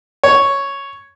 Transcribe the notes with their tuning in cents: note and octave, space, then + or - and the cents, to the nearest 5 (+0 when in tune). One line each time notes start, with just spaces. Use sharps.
C#5 +0